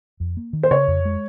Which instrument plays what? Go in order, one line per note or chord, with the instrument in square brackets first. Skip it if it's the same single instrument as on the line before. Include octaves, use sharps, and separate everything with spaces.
[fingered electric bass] F2
A#3
D#3
[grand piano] C5
[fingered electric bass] C#3 [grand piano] C#5
[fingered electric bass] F2
G#3